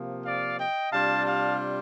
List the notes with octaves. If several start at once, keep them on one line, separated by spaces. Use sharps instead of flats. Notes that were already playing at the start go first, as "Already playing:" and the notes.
Already playing: C3 F3 A#3
D5 F5
D#5 G5
C3 G3 D4 F4 F5 A5
F5 A5